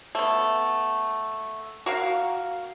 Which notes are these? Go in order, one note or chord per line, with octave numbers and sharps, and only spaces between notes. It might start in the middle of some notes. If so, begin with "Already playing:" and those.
A3 B3
F#4 A#4 F5